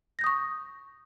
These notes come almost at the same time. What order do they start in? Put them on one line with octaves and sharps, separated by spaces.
A#6 G6 D#6 C#6